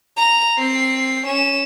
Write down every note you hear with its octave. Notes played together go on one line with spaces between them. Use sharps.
A#5
C4 C7
C#4 E7